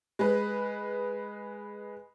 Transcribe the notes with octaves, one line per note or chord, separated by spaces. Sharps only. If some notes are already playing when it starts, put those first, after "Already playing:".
G#3 B4